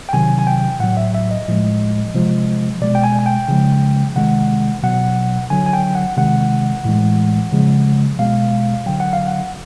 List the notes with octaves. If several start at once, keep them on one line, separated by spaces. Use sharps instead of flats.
G5
C3 D#3 F#3 G#5
G#5
G5
A2 F#3 F#5
E5
E5
D#5
A2 F3 G#3
C3 F3 G#3
B2 G#3 D5
G5
G#5
G#5
G5
C#3 F3 G#3
C3 D#3 G#3 F#5
B2 F#3 F#5
D3 F#3 G#5
G#5
G5
F#5
C3 D#3 G#3 F#5
A2 E3 G#3
C#3 F3 G#3
B2 G#3 F5
D3 F#3 G5
F#5
F5
F#5